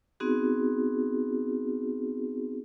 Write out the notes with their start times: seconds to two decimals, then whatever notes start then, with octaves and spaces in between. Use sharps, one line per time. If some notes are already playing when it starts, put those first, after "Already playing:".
0.20 B3 C4 D#4 F#4 G#4